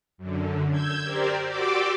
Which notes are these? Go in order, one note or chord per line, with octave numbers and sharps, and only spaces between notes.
F#2 D3
E6 G6 G#6
G4 A#4 C5 D5
F#4 G4 D5 C6 D6 E6